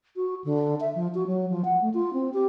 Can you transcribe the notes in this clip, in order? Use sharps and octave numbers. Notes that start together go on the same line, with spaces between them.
F#4
D3
E5
F3
F#4
F#3
F3
F#5
A3
F4
C4
G4